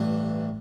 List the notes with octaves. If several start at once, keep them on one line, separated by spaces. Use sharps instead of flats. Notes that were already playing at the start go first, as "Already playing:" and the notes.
Already playing: A1 G2 E3